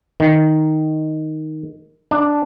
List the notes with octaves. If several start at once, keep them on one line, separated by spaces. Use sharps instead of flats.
D#3
D4